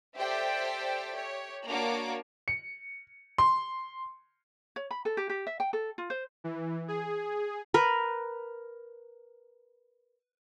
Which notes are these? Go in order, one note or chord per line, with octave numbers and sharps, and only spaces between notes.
G4 A4 C5 D5 E5 G5
G4 C#5
A#3 D4 F#4 C#5 D6
C#7
C6
C#5
B5
A4
G4
G4
E5
G5
A4
F4
C5
E3
G#4
A#4 B4